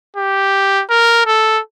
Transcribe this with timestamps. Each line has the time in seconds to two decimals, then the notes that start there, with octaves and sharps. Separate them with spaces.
0.16 G4
0.90 A#4
1.26 A4